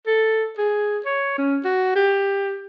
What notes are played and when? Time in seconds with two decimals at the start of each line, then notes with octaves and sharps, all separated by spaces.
0.07 A4
0.58 G#4
1.05 C#5
1.38 C#4
1.65 F#4
1.96 G4